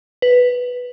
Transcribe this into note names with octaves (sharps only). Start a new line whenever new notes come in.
B4